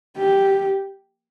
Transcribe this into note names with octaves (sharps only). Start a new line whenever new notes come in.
G4